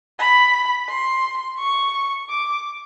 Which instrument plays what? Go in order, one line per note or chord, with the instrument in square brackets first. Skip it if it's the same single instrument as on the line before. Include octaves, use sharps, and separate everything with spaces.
[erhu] B5
C6
C#6
D6